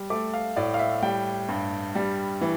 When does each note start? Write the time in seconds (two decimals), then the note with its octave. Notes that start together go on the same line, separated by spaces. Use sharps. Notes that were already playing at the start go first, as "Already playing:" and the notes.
Already playing: G3
0.10 A3 D6
0.34 F5
0.56 A2 D5
0.74 F5
0.79 E5
1.03 G3 G5
1.49 G2
1.95 G3
2.41 E3